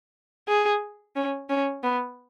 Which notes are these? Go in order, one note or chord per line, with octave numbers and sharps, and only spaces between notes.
G#4
C#4
C#4
B3